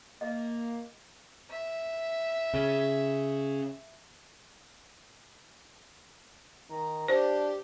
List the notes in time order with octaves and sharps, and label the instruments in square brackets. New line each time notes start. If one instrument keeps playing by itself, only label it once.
[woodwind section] A#3 [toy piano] D#5
[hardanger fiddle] E5
[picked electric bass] C#3
[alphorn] D#3 [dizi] A#5
[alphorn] D4 [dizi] G4 [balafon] C5